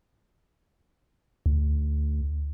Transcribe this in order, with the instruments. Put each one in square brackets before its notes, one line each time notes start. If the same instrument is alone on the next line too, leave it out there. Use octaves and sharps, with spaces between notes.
[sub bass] D2